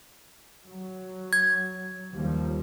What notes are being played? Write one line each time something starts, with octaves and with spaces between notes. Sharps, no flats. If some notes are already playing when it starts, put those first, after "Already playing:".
F#3
G#6
D#2 F3 G3